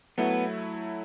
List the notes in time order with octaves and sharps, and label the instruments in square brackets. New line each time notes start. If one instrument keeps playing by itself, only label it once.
[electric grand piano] F#3 A3 E4 [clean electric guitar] B3